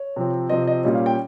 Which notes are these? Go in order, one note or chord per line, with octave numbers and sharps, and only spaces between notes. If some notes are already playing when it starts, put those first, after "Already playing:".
Already playing: C#5
C3 F3 C4
C3 F3 C4 D#5
D#5
A#2 G3 C#4 D#5
F5
G5